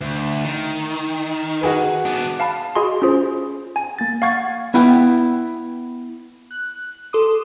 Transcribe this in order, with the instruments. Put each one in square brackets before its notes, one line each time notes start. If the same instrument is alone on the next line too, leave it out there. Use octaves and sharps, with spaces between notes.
[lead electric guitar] D2
D#3
[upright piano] F#4 G#4 B4
[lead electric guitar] B3 D4
[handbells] F5 A5 B5
F#4 G#4 D#5 G#5 B5 C6
C#4 F4 G#4 C5
G#5
A#3 A6
F5 F#5 C#6 G#6 A6
[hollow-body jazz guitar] B3 E4 E5 G5
[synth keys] F#6
A4 C6 D6 D#6